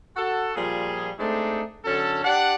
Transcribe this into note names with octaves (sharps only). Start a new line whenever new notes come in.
F#4 A4
A#2 F3 G3 G#4
G#3 A3 C4 D4 D#4
F#2 D3 C#4 A4
D4 G4 D5 F#5